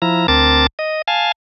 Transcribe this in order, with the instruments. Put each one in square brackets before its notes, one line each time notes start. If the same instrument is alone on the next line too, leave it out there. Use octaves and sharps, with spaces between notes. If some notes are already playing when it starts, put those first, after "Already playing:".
[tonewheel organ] F3 E4 A#5
D2 C4 A#4 A5 D6 A6
D#5
F5 G#5 A5